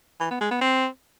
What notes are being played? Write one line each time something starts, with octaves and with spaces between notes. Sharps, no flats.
E3
B3
G#3
B3
C4